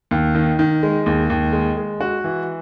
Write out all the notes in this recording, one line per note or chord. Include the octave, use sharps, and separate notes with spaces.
D#2
D#3
D#3
G#3
D#2
D#2
G#3
G#3
F#4
E3